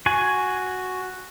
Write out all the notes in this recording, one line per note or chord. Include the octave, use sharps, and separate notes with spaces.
F#4 G#5